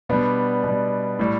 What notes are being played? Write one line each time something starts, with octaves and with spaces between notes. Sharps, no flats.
B2 G3 B3 D4
B2 G3
A2 G3